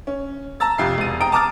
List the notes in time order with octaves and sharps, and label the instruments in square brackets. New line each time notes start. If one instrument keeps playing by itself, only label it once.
[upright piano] C#4
A5 A#5 E6 A6
F2 C3 F5 C7
E1 D#7
G5 A#5 D#6 D7
A5 A#5 D6 D#6 F6 A6